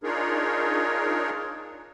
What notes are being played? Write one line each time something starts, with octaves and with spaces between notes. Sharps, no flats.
D4 D#4 F4 G#4 A#4 C#5